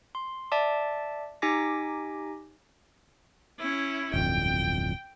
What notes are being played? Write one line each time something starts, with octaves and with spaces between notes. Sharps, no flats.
C6
D5 E5 A5 D6
D#4 G4 G#5 D6 A#6 B6
C#4 E4
D1 G1 F2 G5